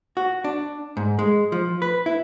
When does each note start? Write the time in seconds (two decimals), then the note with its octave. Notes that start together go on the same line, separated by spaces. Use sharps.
0.17 F#4
0.44 D4
0.97 G#2
1.19 G#3
1.52 F3
1.82 B4
2.06 E4